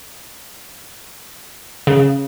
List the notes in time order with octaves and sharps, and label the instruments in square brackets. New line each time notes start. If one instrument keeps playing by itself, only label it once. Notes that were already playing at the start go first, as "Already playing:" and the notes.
[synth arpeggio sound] C#3